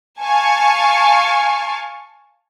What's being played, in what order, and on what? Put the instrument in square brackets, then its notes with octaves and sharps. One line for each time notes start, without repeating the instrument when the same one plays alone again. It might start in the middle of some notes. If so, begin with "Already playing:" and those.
[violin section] F5 G#5 A5 C#6